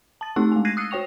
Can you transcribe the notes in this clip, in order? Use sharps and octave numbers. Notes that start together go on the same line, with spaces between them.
A5 A6
A3 C4 D#4 G4 C#6 F#6
G#3 G#5
F#6 G#6 A#6 C7 D#7
D#6 E6 F#6 C7 C#7
F#4 C#5 G5 C#6 F7